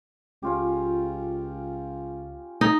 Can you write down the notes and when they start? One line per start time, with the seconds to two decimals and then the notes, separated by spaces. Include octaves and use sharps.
0.42 C#2 C#4 F4 G4
2.61 D#4